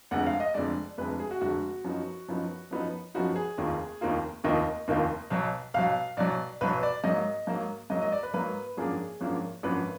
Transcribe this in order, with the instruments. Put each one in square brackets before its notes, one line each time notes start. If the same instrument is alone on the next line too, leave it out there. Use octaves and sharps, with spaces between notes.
[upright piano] F1 F2 D3 G#3 F#5
F5
D#5
F1 F2 D3 G#3 D5
F1 F2 D3 G#3 B4
G#4
F#4
F1 F2 D3 G#3 F#4
F#2 F3 B3 D#4
F#2 F3 B3 D#4
F#2 F3 B3 D#4
F#2 F3 B3 D#4 F#4
G#4
F1 D#2 D#3 A#3 F4
F1 D#2 D#3 A#3 F4
F1 D#2 D#3 A#3 F4 D#5
F1 D#2 D#3 A#3 F4
B1 B2 F#3
B1 B2 F#3 F5
B1 B2 F#3 D5
B1 B2 F#3 B4
D5
G#2 F#3 A#3 D#5
G#2 F#3 A#3
G#2 F#3 A#3 D#5
D#5
D5
B4
G#2 F#3 A#3 B4
G#1 F#2 F3 A#3 D4 G#4
G#1 F#2 F3 A#3 D4
G#1 F#2 F3 A#3 D4 B4